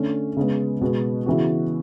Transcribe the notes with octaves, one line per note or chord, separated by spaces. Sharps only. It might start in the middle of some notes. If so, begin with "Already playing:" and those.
Already playing: D3 A3 C#4
C#3 G#3 B3
B2 G#3 B3 F#4
C#3 E3 B3 F#4